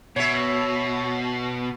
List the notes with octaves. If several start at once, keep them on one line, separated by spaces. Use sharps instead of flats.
B2 C#5 E5